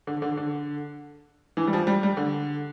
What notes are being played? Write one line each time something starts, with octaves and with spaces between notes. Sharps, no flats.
D3
D3
D3
E3
G3
F3
G3
G3
D3